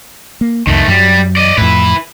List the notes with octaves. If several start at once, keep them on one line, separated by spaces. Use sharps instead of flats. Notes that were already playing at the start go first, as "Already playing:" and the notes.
A#3
C2 F2 D#3 A3
F#2 F#3 G3
D5 D#5
F2 A2 E4 B4